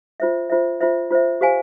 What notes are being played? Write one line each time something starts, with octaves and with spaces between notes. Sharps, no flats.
F4 C5 E5
F4 C5 E5
F4 C5 E5
F4 C5 E5
G4 C5 F5 G#5